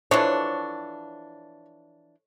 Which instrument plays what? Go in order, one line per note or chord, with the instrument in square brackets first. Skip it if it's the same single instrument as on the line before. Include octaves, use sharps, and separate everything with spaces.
[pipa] E3 F3 D4 [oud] C#5